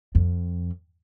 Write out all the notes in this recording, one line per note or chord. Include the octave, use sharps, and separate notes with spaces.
F2